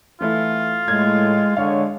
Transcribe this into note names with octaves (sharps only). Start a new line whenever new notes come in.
E3 A3 E4 F4
A2 G#3 G#6
D3 G#3 C#5 F5